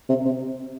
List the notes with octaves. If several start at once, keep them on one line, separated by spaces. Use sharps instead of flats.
C3
C3